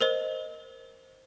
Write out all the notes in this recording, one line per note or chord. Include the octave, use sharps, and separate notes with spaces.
A#4 C5 D#5